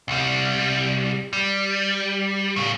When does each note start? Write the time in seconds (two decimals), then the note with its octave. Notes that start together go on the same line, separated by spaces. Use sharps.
0.08 C2 G3
1.33 G3
2.56 A2 C#3